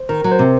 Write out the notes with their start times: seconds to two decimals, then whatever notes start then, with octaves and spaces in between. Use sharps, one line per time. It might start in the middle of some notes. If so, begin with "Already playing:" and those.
Already playing: C5
0.09 D#3 A#4
0.24 F#3
0.31 C5
0.39 C3